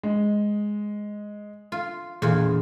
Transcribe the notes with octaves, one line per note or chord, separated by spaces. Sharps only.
G#3
F4
E1 E2 A#2 F4